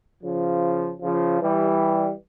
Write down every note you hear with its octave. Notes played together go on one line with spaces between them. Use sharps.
C#3 F3
C#3 F3
E3 G3